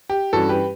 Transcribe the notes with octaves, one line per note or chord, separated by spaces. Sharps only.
G4
G2 E3 G3 C#4 F#4 A4
G4 B4